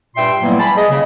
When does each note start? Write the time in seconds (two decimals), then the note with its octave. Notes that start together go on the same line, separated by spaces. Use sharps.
0.16 G2 A#2 E5 G5 C6
0.41 E3 F#3 G3 A#3 B3
0.60 G#5 A5 B5
0.77 G#4 D#5
0.90 C#3